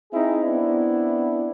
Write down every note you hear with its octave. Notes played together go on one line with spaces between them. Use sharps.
C4 D#4 E4 G#4
B3 C4 D4 E4